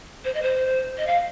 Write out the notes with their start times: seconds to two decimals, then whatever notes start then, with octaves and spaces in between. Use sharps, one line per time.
0.24 C5
0.34 D#5
0.42 C5
0.97 D#5
1.06 F5